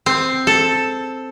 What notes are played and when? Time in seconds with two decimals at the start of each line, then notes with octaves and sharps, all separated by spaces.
0.06 C4
0.47 A4